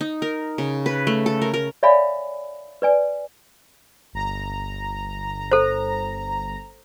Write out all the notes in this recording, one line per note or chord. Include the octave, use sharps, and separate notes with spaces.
D#4
A#4
C#3
B4
A3
A4
A#4
A#4
C#5 D5 E5 F5 G#5 B5
B4 D5 G#5
G1 A#5
A4 C5